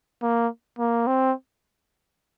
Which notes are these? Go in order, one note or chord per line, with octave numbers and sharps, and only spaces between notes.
A#3
A#3
C4